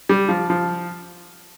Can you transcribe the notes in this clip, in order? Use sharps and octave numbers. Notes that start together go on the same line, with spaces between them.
G3
F3
F3